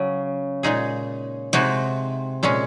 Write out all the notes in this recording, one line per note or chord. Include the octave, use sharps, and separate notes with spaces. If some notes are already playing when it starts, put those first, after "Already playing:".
Already playing: C#3 F#3
A#2 G#3 D#4 G#4
C3 G#3 D#4 F#4
A#2 G#3 C#4